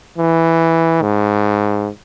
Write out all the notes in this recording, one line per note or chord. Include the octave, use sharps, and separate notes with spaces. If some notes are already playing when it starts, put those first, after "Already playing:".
E3
G#2